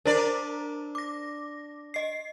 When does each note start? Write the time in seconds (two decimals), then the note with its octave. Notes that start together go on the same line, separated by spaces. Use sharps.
0.06 D4 A#4 C5 D5 A#5
0.95 D6 A#6
1.94 D#5 C7